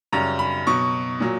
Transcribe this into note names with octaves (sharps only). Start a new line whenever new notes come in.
F#2 C#3 G3 A#5
B5
B2 F#3 C#6
A#2 F#3